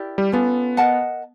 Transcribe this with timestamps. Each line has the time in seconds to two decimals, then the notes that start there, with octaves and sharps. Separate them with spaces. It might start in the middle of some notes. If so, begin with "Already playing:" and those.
Already playing: E4 G4 A#4 D5
0.18 G3
0.32 B3 C#4 F4 A4
0.77 A#4 D#5 F#5 A5